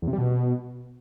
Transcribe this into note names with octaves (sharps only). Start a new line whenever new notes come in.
E2
C3
G3
B2